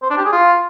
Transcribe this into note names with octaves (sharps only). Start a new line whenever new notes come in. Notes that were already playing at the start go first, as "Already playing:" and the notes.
C5
D4
G4
G#4
F4